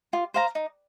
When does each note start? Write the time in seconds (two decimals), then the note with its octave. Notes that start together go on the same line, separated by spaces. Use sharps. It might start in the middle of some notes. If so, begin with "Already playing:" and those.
0.13 F4
0.34 C5 F5 A#5
0.55 D#4